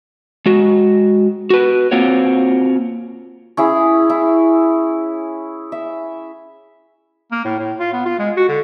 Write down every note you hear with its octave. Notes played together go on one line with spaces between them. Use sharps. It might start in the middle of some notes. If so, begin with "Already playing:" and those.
G#3 F#4
F#4 B4
A#3 C4 F4 F#4 C#5
C#4 E4 G#4
E4
E5
A#3
A2
A2
F4
B3
F4
G#3
F#4
D3